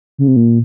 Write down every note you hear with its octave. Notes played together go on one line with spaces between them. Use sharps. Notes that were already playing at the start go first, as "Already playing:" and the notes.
C#3
C3
A#2